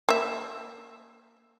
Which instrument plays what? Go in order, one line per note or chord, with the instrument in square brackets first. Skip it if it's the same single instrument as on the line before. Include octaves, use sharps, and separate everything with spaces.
[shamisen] A#3 E5